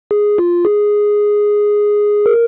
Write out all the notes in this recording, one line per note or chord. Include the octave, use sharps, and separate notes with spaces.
G#4
F4
G#4
A#4